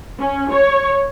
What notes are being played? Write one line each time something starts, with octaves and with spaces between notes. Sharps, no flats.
C#4
C#5